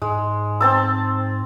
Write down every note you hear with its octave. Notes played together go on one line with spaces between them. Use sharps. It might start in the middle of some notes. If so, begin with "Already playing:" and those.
G#2 G#3
C4 A5 E6